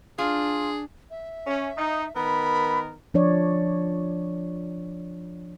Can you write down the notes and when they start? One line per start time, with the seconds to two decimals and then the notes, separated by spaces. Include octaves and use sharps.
0.18 D4 F4 G#4
1.11 E5
1.47 C#4
1.77 D#4
2.16 D#3 B3 A#4 B5
3.14 F3 D4 C#5 D5